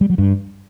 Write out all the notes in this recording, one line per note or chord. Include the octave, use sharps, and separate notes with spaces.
G3
F#3
G2